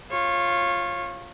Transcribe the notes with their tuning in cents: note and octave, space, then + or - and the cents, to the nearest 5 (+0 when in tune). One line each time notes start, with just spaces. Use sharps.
F4 +0 C#5 -25